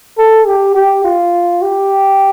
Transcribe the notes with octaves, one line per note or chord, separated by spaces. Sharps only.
A4
G4
G4
F4
G4